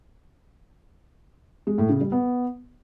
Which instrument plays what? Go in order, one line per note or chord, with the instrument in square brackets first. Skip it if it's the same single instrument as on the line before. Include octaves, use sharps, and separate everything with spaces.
[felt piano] G#3
A2
C#3
G3
B3